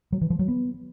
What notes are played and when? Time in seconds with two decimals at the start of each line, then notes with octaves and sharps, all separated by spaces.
0.12 F#3
0.21 E3
0.30 F3
0.39 F#3
0.48 B3